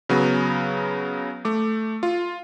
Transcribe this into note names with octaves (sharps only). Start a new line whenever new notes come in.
C#3 F#3 B3
A3 D6
F4